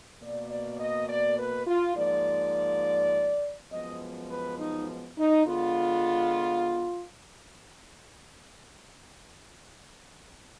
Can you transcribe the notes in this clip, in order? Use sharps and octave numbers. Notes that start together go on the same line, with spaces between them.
B2 A#3 D5
D5
D#5
D5
B4
F4
G#2 F3 A#3 D5
F#2 F3 G#3 B3 D#5
B4
D#4
D#4
D3 G#3 B3 F4